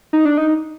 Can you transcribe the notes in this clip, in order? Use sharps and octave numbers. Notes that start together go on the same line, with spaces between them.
D#4
D4
D#4